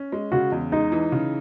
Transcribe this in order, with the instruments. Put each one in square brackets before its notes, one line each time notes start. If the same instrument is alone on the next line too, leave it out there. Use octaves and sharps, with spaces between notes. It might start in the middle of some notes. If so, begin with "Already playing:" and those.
Already playing: [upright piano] C#4
G#3
[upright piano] C#3 [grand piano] F#4
[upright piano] E2
[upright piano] G#3 [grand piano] D#4
[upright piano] E3
C#3